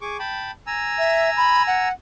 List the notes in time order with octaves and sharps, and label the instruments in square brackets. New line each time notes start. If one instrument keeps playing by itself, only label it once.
[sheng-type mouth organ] G#4 C#6 D6
G5 A5 B5
G#5 A#5 E6
[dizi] E5
B5
F#5